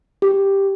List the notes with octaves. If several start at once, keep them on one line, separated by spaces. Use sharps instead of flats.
G4